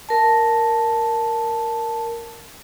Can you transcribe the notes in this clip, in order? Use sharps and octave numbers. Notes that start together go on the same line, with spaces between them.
A#4 A5